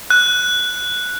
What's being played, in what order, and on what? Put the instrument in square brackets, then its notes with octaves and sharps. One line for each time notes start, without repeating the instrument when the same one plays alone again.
[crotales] F#6